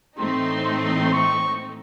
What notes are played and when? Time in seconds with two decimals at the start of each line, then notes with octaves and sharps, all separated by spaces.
0.19 A2 E3 A3 C4 D#4 C6
0.66 C6
1.13 C#6